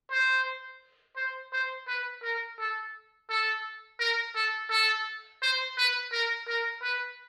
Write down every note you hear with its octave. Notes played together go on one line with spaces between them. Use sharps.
C5
C5
C5
B4
A#4
A4
A4
A#4
A4
A4
C5
B4
A#4
A#4
B4